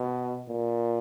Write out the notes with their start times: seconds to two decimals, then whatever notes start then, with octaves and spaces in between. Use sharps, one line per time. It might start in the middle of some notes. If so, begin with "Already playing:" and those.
Already playing: B2
0.49 A#2